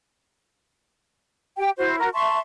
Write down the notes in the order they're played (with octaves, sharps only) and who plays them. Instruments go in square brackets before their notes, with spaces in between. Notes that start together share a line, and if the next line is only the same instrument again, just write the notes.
[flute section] G4 G5
E4 F#4 C5
F#4 A#4
E5 A5 C6 C#6